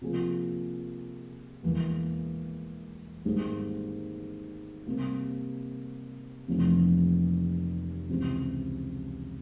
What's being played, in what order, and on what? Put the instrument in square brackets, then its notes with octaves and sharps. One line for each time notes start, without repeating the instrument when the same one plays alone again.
[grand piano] C3 F3 A#3 F4 G#4
E1 E2 E3 A#3
G#1 G#2 G3 A#3
C3 G3 A#3
F1 F2 C3 E3 A#3
C#2 C3 E3